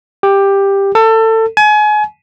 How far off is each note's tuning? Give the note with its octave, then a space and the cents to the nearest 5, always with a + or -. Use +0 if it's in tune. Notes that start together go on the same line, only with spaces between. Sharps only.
G4 +10
A4 +25
G#5 +30